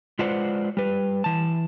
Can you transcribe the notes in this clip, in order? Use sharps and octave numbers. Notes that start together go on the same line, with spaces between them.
G#3 F4 B4 C5 D5 F#5
G3 B4
E3 A5